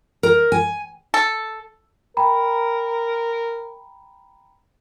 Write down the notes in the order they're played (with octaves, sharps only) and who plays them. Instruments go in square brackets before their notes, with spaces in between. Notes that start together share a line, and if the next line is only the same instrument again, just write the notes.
[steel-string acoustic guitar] A#4
G#5
[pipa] A4
[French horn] A#4 [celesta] G5 A#5 B5